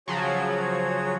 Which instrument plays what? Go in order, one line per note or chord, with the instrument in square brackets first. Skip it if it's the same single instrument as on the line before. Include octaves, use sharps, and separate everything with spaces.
[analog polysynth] C#3 F3 F#3 [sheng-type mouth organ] F#4 G#4 C#5